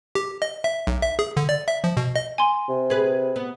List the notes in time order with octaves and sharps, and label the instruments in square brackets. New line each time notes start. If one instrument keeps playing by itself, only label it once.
[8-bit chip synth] G4
D#5
E5
B1
E5
G#4
D3
D5
E5
F3
B2
D#5
[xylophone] G#5 C6
[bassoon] C3
[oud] G#4 B4
B3